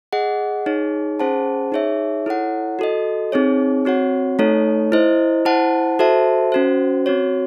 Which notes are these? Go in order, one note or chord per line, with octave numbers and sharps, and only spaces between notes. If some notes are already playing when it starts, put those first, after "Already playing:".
G#4 D#5 F#5
D#4 G#4 C#5
C#4 G#4 C5 F#5 A5
D#4 G#4 C#5 E5
E4 A4 C#5 F#5
F#4 A4 D#5
C4 D#4 G#4 C#5
C4 F#4 C#5 F#5
A3 D#4 A4 C#5
E4 C5 D#5
E4 C5 F#5 A5
F#4 A4 C5 E5 A5
C#4 F#4 C5
C4 F#4 C#5